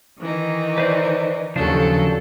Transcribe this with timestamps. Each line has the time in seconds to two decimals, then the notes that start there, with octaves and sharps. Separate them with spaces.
0.19 D#3 E3 D#4
0.78 B4 C5 D5
1.56 D#2 C#3 F3 F#3 D4 A4